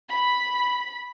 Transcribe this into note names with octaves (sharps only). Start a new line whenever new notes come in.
B5